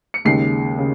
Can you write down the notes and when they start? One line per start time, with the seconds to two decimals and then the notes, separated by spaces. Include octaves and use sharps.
0.14 C#7
0.25 D#2 C#3 G#3 C7
0.78 C#3